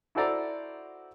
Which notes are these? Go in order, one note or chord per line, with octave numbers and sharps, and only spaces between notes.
E4 F#4 A4 C5 D5 A#5